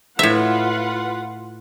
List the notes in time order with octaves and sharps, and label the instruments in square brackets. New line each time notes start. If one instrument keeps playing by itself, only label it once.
[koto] A2 E5 [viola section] F4 B4 F#5